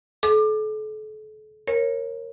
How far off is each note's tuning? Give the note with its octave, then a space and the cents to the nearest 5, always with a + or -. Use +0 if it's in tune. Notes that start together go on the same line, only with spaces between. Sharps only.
A4 -40 D6 +25
A#4 +0 C#5 -20